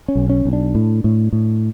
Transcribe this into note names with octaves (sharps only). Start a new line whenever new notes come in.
C#4
B1
C#4
B1
D4
A2
A2
A2